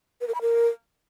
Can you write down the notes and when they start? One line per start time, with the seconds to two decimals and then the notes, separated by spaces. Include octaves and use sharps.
0.21 B4
0.28 A#4
0.35 B5
0.41 A#4